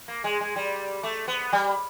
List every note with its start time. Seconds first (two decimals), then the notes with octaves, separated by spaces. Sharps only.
0.08 A#3
0.24 G#3
0.40 G#3
0.56 G3
1.03 A3
1.28 B3
1.53 G3